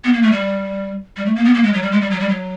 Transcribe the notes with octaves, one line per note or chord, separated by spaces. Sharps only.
B3
A#3
A3
G3
G3
A3
A#3
B3
A#3
G#3
F#3
G3
G#3
G3
F#3
G3
F#3